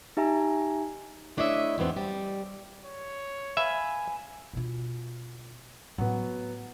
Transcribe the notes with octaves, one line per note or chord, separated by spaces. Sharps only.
D#4 G4 E5 G#5 A#5
A3 D4 E4 C#5 D#5 E5
E2 G#2 B3 C4
G3
C#5
B4 E5 F5 G#5
B2 F4
A2 F#3 B3